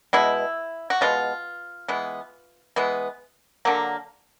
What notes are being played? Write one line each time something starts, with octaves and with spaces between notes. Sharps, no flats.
B2 G#3 B3 E4
F#4
B2 G#3 B3 F4
E3 G#3 B3
E3 G#3 B3
D3 F#3 A#3